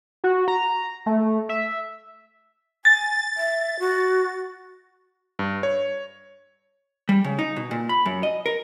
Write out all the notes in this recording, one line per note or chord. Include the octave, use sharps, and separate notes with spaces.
F#4
A#5
A3
E5
G#5 A6
E5
F#4
G2
C#5
G3
C#3
D#4
B2
A#2
B5
F#2
D#5
A#4